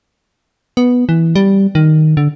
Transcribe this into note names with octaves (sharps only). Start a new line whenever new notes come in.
B3
E3
G3
D#3
D3